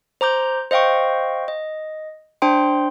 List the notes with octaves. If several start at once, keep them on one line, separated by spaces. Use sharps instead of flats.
C5 A#5 D6 G6
C5 D#5 F5 G5 C#6
D#5
D4 C5 G5 C6